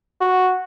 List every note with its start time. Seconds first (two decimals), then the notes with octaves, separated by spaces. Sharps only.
0.20 F#4